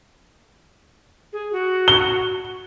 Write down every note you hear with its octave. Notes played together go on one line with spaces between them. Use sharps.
G#4
F#4
G7